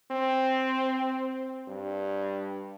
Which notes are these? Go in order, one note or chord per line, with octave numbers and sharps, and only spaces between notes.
C4
G2